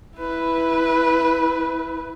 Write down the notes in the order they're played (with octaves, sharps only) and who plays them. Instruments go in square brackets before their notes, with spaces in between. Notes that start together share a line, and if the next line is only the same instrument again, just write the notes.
[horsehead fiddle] E4 B4